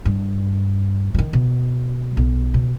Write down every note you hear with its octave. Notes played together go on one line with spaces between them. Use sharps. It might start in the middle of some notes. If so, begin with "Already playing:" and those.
G2
D#3 F3
B2
B1
B2